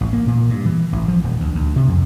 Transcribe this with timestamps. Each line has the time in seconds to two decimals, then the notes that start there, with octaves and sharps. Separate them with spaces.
0.01 A1
0.13 A#3
0.27 A#2
0.50 G2
0.66 E3
0.93 A1
1.08 F3
1.24 D#1
1.40 D2
1.55 D2
1.76 C3
1.88 F2